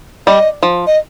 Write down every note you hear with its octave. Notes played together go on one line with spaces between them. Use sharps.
G3 D#5
F3
D#5